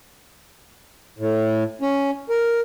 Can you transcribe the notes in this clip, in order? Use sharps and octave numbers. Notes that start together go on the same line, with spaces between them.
A2
C#4
A#4